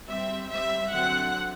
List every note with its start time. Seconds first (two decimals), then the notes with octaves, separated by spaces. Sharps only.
0.08 G3 C4 E5
0.50 G3 C4 E5
0.92 D3 F#3 C4 F#5